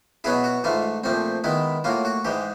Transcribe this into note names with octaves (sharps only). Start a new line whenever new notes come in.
B2 F#3 B3 E4 G#4
F#4
G#2 E3 A3 F4
A#2 F3 A3 C4
D#3 G#3 B3 E4
A2 F#3 A#3 F4
F#4
G#2 E3 G#3 G4